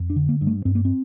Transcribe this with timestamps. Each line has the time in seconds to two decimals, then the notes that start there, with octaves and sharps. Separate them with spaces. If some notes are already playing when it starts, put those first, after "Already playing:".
Already playing: F2
0.10 D4
0.16 D3
0.29 A#3
0.41 G2
0.47 A3
0.65 G2 C4
0.75 A#3
0.85 C4